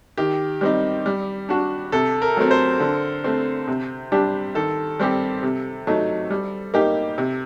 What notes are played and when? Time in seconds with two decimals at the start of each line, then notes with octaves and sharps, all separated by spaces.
0.18 D#3 G4
0.61 G3 C4 D#4
1.06 G3
1.49 D4 F#4
1.92 C3 A4
2.22 A#4
2.37 F#3 A3 C4
2.51 C5
2.80 D3
3.24 A3 C4
3.68 C3
4.12 G3 D4 G4
4.55 D#3 A4
4.99 G3 C4 G4
5.43 C3
5.87 F#3 A3 D#4
6.30 G3
6.74 A#3 D#4 G4
7.18 C3